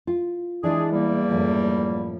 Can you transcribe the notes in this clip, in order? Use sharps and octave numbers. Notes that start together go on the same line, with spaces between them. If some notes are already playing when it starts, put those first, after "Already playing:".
F4
E3 G#3 D4 G#4
E2 G3 A#3
F#2 A2 F3